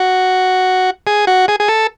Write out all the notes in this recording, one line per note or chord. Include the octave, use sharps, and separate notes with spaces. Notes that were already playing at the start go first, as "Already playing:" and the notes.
Already playing: F#4
G#4
F#4
G#4
G#4
A4